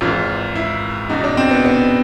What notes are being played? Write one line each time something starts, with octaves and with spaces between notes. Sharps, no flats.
G#1 G#2 E3 F4
E4
E2 B2 D#4
D4
C4
B3
B3